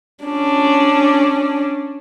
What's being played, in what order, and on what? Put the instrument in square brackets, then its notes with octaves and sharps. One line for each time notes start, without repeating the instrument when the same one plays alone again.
[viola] C#4 D4